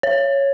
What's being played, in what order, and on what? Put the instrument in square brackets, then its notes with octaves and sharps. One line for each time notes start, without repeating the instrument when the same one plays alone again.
[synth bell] C#5